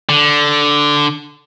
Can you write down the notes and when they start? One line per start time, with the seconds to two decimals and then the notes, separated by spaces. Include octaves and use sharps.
0.09 D3